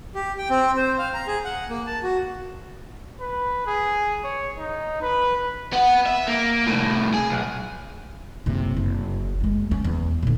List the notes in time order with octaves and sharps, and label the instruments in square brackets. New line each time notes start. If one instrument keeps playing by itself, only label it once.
[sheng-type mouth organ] G4
G5
C4
C5
F5
A#5
G#4
F#5
A#3
A5
F#4
[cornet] B4
G#4
C#5
D#4
B4
[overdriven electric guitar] B3 F#5
E5
A#3
C2 A2
G#4
B1
[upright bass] F#1 C3
F#1
F#1 G#3
C#4
E2
A#2 D3